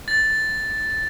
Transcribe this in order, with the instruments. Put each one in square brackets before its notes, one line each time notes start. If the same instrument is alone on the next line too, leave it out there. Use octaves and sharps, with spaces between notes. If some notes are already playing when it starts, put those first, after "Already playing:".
[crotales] A6